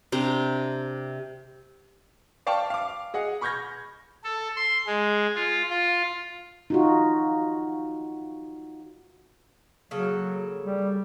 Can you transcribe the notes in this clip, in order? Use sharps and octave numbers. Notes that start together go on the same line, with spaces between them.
C3 D4 G5 A#5
D5 F5 G5 A5 C#6
F5 D6
G#4 D#5 F#5
B5 C#6 F6 G6 G#6 A#6
A4
C6
G#3
F4
F4
D#4 F4 F#4
C#3 F#3 A#3 A4
G3